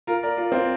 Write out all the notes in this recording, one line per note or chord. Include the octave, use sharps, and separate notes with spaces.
F4 A#4
A#4 D5
F4 A#4
C4 F4